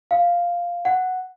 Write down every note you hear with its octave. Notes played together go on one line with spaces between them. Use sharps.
F5
F#5